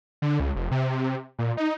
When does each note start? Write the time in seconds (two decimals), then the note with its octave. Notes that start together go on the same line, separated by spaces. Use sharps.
0.22 D3
0.40 C#2
0.56 F1
0.71 C3
1.39 A#2
1.57 D#4